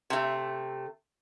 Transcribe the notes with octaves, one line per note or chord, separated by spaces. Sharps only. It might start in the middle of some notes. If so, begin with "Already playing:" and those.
C3 A3